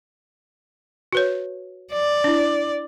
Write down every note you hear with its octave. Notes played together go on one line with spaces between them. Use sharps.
F#4 B4 C#5
D5
D4 E4